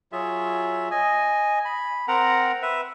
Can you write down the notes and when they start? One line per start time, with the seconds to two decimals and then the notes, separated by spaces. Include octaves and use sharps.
0.12 F#3 F4 G#4 E5
0.91 D#5 G#5
1.65 B5
2.08 C4 A#4 F#5 A#5
2.62 B4 E5